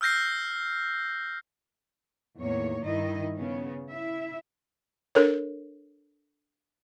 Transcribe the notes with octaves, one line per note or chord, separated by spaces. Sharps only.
E6 F6 G6 A#6 C7
E2 A2 D#3 A#3 C#5
G2 D#3 G3 E4 D#5
C#3 B3 C#4
E4 E5
D4 A4 A#4 C#5